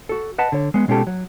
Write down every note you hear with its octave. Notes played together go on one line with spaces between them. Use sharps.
F#4 A4
B4 D#5 F#5 A5 B5
D3 C#5
G#3 B3
B2 G#3 C#4 F4 G4 A4
F#3